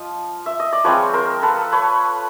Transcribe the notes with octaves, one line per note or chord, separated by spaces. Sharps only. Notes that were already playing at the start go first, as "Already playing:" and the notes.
Already playing: F3 F4 D#5
E5
D#5
D5
F3 G#3 C4 F4 B4 C#5
A#4 C5
A4 B4
B4 C#5